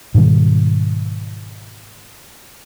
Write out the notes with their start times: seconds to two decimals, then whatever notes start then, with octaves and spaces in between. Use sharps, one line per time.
0.15 G#2 B2 D#3 G3